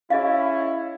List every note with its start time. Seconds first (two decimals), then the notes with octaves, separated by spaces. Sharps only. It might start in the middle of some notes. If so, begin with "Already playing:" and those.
0.10 C#4 E4 G#4 D#5 F5